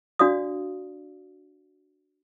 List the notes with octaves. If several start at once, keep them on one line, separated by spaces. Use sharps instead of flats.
D4 F#4 D5 F5 D#6